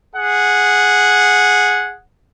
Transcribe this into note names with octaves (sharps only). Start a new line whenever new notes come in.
G#4 F#5